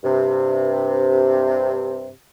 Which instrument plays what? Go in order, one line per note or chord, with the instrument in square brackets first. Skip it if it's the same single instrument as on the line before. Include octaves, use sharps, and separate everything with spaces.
[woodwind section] G2 C3